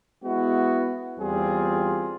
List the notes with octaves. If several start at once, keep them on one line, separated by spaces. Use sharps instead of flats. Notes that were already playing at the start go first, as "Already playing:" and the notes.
G#3 B3 E4 F#4
E2 G3 C4 F4 G#4